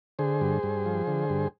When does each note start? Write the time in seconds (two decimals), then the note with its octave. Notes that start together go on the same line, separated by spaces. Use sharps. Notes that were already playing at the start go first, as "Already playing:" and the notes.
0.19 D3 G#4 C5
0.41 G2
0.63 G2
0.86 F3
1.07 D3
1.30 G2